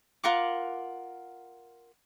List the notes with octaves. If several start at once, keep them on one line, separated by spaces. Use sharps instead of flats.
F4 A#4 F#5 D6